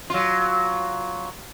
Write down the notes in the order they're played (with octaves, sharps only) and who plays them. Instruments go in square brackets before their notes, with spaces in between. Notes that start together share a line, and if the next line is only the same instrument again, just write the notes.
[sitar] F#3 F4